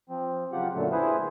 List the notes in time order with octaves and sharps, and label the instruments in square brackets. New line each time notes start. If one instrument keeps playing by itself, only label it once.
[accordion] F3 C4
C#3 F#3 F4 G4 F#5
F#2 A#2 D3 F#3 A3
E4 G#4 B4 C5